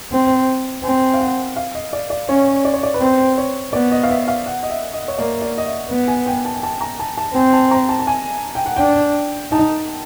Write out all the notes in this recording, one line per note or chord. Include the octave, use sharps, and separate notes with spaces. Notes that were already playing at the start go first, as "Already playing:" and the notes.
C4
C4 G#5
F5
F#5
F5
D#5
D5
D5
C#4 C#5
D5
C#5
D5
B4
C4 C5
C#5
B3 D5
D#5
F5
E5
F5
F#5
D#5
E5
D#5
C#5
A#3 D5
D5
D#5
E5
B3
G#5
G5
A5
G#5
A5
A#5
A5
A5
C4 G#5
A5
A#5
A5
A5
G#5
G5
F#5
D4 G5
D#4 A5